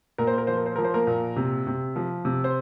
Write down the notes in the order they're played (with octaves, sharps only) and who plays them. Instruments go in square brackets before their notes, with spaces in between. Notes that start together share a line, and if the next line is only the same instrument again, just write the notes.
[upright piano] A#2 A#4
C5
A#4
F3 C5
A#4
C5
F3 A#4
C5
A#3 A#4
A#2
C3
C3
F3
C3
C5